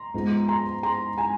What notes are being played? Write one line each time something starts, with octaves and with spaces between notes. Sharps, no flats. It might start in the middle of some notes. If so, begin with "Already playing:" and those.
Already playing: A#5 C6
G#2 F3 G#3 B3
A#5 C6
A#5 C6
G#5 A#5